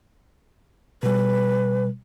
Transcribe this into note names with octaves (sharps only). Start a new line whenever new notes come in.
B2 G3 B4